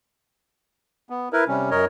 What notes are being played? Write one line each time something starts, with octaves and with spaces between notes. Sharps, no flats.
B3
E4 A#4 B4
C3 G3 C#4
F#2 A#4 C#5 D#5